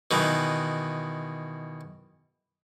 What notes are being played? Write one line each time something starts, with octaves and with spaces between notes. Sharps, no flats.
B2 D#3 E3